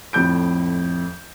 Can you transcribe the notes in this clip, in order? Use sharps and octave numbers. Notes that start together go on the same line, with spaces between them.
F2 A2 G6 D7